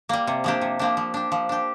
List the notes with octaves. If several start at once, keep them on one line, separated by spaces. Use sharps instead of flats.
G3 A#3
C3
F3 A#3 D4 G4
C3
F3 A#3 D4 G4
F3
D4 G4
F3
D4 G4